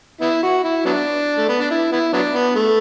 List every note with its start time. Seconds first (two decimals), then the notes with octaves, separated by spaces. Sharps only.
0.21 B3 E4
0.43 F#4
0.64 E4
0.85 F#3 B3 D4
1.37 A3
1.48 B3
1.59 D4
1.70 E4
1.92 B3 E4
2.13 F#3 B3 D4
2.34 B3
2.55 A3